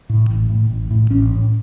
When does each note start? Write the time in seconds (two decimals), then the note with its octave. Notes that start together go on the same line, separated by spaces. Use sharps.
0.09 A2
0.30 A1
0.50 A2
0.70 A1
0.91 A2
1.10 A1 C#4
1.31 A2